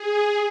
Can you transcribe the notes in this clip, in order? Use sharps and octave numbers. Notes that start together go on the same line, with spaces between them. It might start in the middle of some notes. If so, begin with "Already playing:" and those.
Already playing: G#4